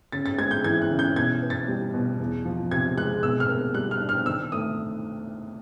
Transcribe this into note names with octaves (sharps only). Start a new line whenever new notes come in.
C#3 A6
A6
G#3 G#6
G6
E3 G#6
F#6
C#3
G6
B2 G#6
B3
A6
G3
B2
E2
F3
C3 G#6
G#3 F#6
B2 E6
F6
A#3
G3 F#6
F6
D4
F6
D#3 E6
A3 D#6